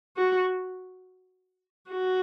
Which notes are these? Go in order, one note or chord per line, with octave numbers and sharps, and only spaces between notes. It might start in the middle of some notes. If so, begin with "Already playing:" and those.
F#4
F#4